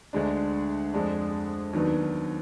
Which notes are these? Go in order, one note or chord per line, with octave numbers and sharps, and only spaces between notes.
D2 D3 G#3 D4
F2 D3 G#3 D4
D#2 D#3 F#3 B3 D4